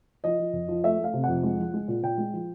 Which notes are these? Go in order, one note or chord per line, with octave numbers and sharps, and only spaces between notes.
F3 D#5
F3
F2
F3
A3 E5
A3
F5
C3
F2 F#5
G#3
F3
G#3
A#2
A#2 G5
G#3
F3